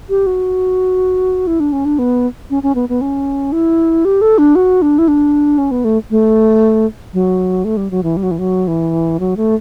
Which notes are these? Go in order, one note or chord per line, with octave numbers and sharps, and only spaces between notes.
G4
F#4
E4
D4
C#4
D4
B3
C#4
C#4
B3
B3
C#4
E4
G4
A4
D4
F#4
D4
E4
D4
C#4
B3
A3
A3
F#3
A3
G3
F#3
E3
G3
F#3
E3
F#3
E3
F#3
A3